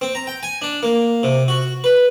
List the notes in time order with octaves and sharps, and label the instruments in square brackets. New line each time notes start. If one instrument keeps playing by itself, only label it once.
[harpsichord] C4
A#5
G5
G#5
D4
A#3
C3
F#4
B4